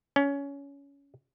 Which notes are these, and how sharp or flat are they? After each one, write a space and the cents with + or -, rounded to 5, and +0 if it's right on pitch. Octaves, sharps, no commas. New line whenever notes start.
C#4 +20